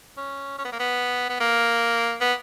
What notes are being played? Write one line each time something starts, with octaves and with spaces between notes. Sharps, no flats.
C#4
C#4
B3
A#3
B3
B3
A#3
B3